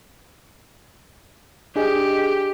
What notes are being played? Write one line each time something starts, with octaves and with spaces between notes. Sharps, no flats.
D4 G4 G#4 D#5